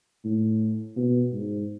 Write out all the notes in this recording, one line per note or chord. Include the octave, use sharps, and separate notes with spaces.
A2
B2
G#2